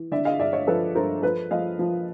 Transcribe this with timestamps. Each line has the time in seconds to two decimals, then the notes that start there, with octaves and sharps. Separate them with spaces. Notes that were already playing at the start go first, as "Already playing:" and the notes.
Already playing: E3
0.11 D3 D5 E5
0.25 D#5 F5
0.39 G2 D5 E5
0.53 C#5 D#5
0.67 F3 A4 B4
0.95 G2 A#4 C5
1.23 F3 A4 B4
1.51 F3 D#5 F5
1.79 F3